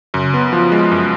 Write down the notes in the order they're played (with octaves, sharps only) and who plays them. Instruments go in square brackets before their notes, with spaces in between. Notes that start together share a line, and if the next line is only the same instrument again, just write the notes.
[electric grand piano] F#2 [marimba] C#3
[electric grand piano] B3
F3
G#3
F#2